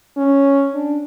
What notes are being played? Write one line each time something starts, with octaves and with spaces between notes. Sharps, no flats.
C#4
D4